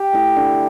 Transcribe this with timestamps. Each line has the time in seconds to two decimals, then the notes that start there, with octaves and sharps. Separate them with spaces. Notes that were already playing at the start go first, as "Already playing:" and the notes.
Already playing: G4
0.13 A3 E4
0.36 D3